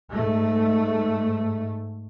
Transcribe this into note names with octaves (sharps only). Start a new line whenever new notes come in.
G#2 A3